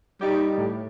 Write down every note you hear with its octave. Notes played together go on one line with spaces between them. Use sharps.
G3 D#4 G4
A2